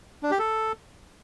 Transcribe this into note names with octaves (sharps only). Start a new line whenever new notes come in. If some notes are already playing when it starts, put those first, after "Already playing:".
D4
G4
A4